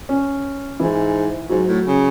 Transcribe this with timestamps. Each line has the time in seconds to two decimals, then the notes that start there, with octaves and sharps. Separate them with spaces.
0.09 C#4
0.80 G#2 E3 E4
1.49 G#2 F#3 F#4
1.67 A2
1.85 C#3